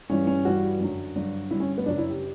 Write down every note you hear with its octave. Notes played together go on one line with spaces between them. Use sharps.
G2 E3 G3 C#4
C#4
G2 E3 G3 F#4
F#2 D3 F#3
G2 D3 F#3
G2 D3 G3 E4
C#4
B3
F#2 C#3 F#3 D4
E4
G4